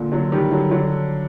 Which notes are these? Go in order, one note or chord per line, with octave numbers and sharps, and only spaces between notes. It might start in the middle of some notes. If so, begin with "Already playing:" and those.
Already playing: A#2 D3
D3 F#3
D#3 G3
D3 F#3
D3 F#3